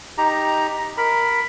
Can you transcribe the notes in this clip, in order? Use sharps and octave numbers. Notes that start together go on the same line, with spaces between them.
D#4 G4 A#5
A#4 B5